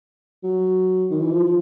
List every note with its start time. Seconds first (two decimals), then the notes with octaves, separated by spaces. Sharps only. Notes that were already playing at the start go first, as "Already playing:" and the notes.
0.43 F#3
1.10 D#3
1.20 E3
1.31 F3
1.45 F3